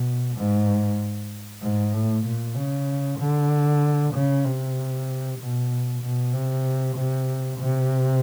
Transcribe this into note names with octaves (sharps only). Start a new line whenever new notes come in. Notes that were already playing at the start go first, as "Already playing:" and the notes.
Already playing: B2
G#2
G#2
A2
A#2
C#3
D3
C#3
C3
B2
B2
C3
C3
C3